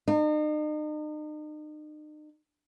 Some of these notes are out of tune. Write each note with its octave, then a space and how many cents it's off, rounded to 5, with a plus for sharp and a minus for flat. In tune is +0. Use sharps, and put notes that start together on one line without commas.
D#4 -40